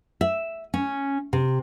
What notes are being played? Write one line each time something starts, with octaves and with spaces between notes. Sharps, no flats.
E5
C#4
C3